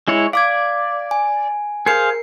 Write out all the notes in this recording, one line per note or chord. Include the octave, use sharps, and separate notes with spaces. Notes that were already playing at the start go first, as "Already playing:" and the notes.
G#3 E4 C#5
D5 F5 D6 G#6
G#5
G#4 A#4 C5 F5 C7 C#7